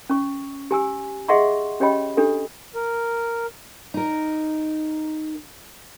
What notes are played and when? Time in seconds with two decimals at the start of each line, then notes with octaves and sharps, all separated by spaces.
0.09 C#4 C#6
0.71 G4 G#5 E6
1.28 G#4 D#5 E5 F#5 C6 C#6
1.80 C#4 G4 C#5 D#5 G5 B5
2.17 D4 G4 A4
2.75 A#4
3.94 D#4 A#4